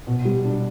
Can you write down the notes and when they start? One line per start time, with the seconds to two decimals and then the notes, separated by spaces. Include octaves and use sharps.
0.07 B2
0.25 G3
0.45 D4